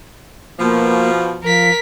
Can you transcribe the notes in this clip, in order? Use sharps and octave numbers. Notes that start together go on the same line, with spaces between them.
B2 F3 A#3
F3 A#4 B6